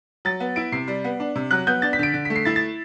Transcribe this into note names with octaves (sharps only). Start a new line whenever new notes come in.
F#3 A6
B3
E4 D7
C3 C7
G3
B3
D4
C3
F#3 F#6
B3 G6
D4 A6
B6
D3 D7
D3
B6
A3
C7
E4 A6
A6